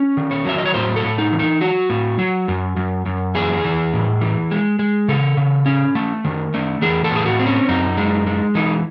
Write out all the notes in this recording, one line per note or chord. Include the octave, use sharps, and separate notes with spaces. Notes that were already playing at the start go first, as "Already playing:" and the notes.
Already playing: C#4
D#3
C#5
F#3 E5
D#5
C#5
A2 C5
A4
A2
D#4
E3
D#4
F#3 F#4
A2
F#3
F#2
F#2
F#2
E3 G#4
E3
A2
E3
G#3
G#3
C#3 A4
C#3
C#4
A3
D#3
A3
E3 G#4
A4
A2 G#4
F#4
C4
C#4
F#2 D#4
G#3
G#3
E3 D#4